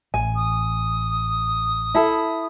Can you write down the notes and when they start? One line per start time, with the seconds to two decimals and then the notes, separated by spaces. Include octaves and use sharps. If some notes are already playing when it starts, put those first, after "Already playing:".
0.14 A1 G#5
0.36 D#6
1.94 E4 A4